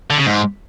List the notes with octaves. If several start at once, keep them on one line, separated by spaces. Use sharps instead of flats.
D3
C#3
G#2